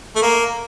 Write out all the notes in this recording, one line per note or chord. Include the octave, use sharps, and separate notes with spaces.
A3
A#3